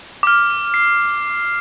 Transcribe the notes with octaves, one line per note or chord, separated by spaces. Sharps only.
D6
F6
C7